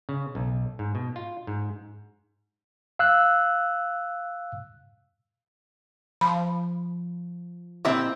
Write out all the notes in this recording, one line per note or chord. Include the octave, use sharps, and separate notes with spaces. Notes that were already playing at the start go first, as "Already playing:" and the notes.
C#3
B1
G#2
B2
F4
G#2
F5 E6 F#6
F3 B5
A#2 C4 E4 G4 D#5 E5